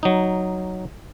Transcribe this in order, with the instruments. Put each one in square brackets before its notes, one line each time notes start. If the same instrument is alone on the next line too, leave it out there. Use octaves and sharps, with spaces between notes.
[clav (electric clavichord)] F#3 D#4